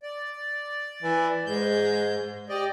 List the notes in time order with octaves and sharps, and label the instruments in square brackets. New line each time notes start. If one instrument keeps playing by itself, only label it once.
[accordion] D5
[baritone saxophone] E3
[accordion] G#2 G6 [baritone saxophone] G#3
[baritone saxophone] G4 [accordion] D5 D#5